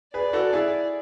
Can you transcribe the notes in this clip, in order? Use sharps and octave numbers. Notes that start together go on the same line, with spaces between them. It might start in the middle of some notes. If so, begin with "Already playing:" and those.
G#4 B4 D5
F#4 A4
E4 G#4